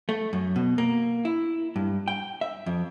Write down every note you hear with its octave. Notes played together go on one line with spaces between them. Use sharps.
A3
F#2
B2
A#3
E4
G2
G5
E5
F2